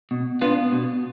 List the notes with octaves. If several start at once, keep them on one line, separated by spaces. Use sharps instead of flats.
B2
B3 D4 F4
B2